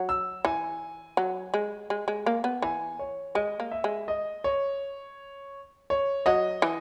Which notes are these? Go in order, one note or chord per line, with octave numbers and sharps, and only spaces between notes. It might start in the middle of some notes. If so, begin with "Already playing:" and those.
Already playing: F#3
E6
E3 G#5
F#3
G#3
G#3
G#3
A#3
B3
E3 G#5
C#5
G#3 D#5
A#3
E5
G#3
D#5
C#5
C#5
F#3 D#5
E3